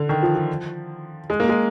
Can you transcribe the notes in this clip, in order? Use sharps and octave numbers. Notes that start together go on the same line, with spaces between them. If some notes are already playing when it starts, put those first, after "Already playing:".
Already playing: D3
D#3
F3
F3
G#3
A#3
G#3